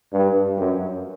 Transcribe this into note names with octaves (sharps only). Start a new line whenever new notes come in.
G2
F#2